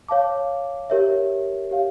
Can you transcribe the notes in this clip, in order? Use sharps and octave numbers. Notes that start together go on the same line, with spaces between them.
C#5 F5 A5 D6
G4 A#4 C#5 E5
G4 C#5 F5